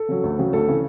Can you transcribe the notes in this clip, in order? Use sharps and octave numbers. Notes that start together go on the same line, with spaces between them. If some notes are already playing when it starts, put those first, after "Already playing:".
Already playing: A4
C#3 F#3
D2
C#3 F#3
D2 A4
C#3 E3